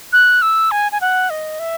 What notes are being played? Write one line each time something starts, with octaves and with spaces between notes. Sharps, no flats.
F#6
E6
G#5
G#5
F#5
D#5
E5